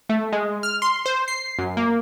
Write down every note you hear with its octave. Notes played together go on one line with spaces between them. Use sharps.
A3
G#3
F6
C6
C5
C7
F#2
A#3